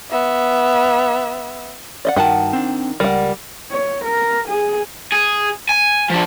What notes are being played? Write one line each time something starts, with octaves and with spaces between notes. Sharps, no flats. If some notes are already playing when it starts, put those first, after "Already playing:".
B3 E5
D5 D#5 F#5
G2 D#3 F#4 F#5 A5
C4 D4
C#2 G3 A#4 D5 F#5
C#5
A#4
G#4
G#4
G#5
F3 D4